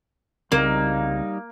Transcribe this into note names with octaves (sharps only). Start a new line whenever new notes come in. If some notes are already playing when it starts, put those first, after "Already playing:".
C2 C#3 G3 A#3 C4 D#4